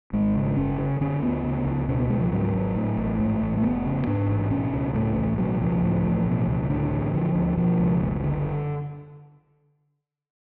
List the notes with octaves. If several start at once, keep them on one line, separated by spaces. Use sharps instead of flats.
G#1 G#3
C#3
F#1 C#4
C#3
D3 C#4
D2 B3
C#3
C#2
B2 C#4
B3
C#2 G#3
F3
G#2 F#3
G#1
A2
A1
G#2 A3
A1
A3
F1 B3
C#3
G#2 D4
A1
B2 C#4
C#2
A2 A3
A1
B2 F#3
C#2 F3
A2
A1
B2
C#2
A2 D3
A1
D3 F3
D2
B2 F3
C#2
F#1
D3